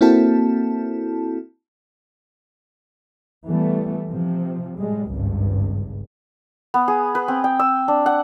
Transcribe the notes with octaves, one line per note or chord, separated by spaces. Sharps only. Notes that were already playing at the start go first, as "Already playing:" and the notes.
A#3 C4 E4 F#4 A4 A5
E3 G3 A3 B3
C3 F3
A2 G3 G#3
G#1 C#2 G2
B3
G#4
B4
C4
G5
E6
D4
F#5